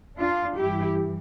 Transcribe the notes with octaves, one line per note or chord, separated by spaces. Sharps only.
D4 F4
G2 E3 E4 G4